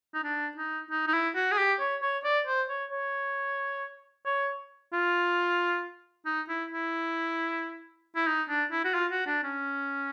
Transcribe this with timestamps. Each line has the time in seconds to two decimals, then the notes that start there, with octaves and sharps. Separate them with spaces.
0.14 D#4
0.24 D4
0.57 D#4
0.91 D#4
1.08 D#4
1.14 E4
1.35 F#4
1.52 G#4
1.58 G4
1.80 C#5
2.03 C#5
2.24 D5
2.47 C5
2.69 C#5
2.91 C#5
4.26 C#5
4.93 F4
6.26 D#4
6.49 E4
6.71 E4
8.16 E4
8.27 D#4
8.49 D4
8.72 E4
8.85 F#4
8.94 F4
9.11 F#4
9.27 D4
9.44 C#4